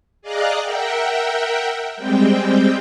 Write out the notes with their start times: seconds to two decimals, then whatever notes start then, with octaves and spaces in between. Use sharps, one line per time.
0.22 G#4 D5 D#5 F5 A#5 F#6
0.62 A#4 E5 F#5 G5
1.97 G3 G#3 C4 G5